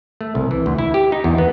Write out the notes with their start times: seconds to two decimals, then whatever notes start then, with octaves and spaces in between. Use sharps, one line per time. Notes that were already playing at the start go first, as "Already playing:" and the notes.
0.21 A3
0.35 C2
0.51 E3
0.66 D2
0.78 E4
0.94 G4
1.12 D#4
1.24 E2
1.38 B3